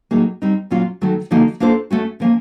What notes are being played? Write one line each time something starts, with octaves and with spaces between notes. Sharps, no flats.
A2 F#3 A#3 D#4 G#4
G3 C4 D#4
A#2 F#3 A#3 C#4 F4
D#3 F#3 A3
D3 F3 A#3 D#4 F#4
A#3 D4 F4 A4 C5
A3 C#4 F#4
D3 F3 A#3 C#4